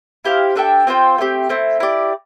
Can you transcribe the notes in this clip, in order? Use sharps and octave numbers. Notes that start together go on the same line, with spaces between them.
E4 G4 C5 F5
D4 A4 E5 G5
C4 F4 C5 G5
A3 C4 G4
A3 C4 E4
E4 G4 D5